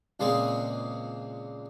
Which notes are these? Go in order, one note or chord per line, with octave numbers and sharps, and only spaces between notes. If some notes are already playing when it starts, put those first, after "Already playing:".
C#2 A#2 G#3 A#3 C4 G#4